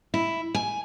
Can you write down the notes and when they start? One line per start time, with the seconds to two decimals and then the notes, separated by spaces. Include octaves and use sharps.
0.14 E4
0.55 G#5